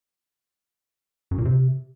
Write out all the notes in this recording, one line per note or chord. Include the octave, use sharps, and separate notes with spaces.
F#2
A#2
C3